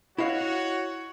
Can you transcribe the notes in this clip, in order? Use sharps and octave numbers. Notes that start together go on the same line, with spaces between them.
E4 F#4 C#5 D#5 F5